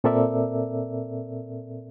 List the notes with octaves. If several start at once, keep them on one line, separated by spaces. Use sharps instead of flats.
A#2 C4 A4 A#4 D5 E5